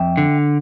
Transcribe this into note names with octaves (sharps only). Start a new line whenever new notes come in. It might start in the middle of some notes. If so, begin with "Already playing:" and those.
Already playing: F2 E5 G5
D3